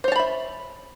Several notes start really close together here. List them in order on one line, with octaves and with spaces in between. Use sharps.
C5 C#5 A5 B5 E5